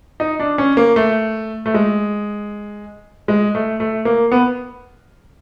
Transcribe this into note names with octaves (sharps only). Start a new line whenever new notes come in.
D#4
D4
C#4
A#3
A3
A3
G#3
G#3
A3
A3
A#3
B3